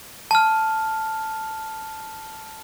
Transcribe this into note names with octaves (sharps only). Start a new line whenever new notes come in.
A5 F6